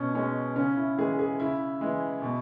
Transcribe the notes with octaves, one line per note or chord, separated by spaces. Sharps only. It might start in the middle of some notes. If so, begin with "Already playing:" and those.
Already playing: B2 C#4
G#3 C#4
C#3 C#4
E4
E3 G#3 G#4
G#4
C#3 E4
E3 G#3
B2